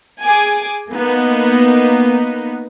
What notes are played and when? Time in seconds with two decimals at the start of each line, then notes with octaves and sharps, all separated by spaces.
0.24 G#4 G#5 D6
0.92 A#3 B3 D#4